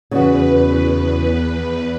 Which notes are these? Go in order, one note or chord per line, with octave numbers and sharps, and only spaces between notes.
E2 C#3 F#4 B4